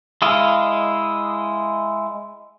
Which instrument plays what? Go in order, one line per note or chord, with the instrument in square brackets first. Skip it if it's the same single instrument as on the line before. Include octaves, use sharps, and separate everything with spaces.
[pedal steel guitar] G#3 E4 D#5 F5